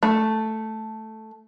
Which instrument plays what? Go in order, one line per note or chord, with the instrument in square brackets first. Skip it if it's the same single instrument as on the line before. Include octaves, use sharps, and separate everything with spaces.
[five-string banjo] A3